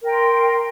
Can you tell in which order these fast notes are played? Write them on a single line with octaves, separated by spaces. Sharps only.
A#4 G5 C6